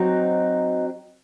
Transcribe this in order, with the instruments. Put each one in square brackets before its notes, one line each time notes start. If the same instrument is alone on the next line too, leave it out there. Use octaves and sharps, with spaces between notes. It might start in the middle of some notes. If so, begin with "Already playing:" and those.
Already playing: [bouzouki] F#3 C4 D#4